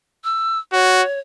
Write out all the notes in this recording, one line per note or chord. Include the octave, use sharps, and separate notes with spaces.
E6
F#4 C#5